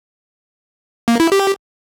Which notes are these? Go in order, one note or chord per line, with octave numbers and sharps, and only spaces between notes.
A#3
E4
G4